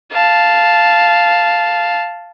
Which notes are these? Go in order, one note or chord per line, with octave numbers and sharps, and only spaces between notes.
F5 A5